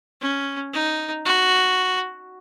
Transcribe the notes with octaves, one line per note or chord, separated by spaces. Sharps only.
C#4
D#4
F#4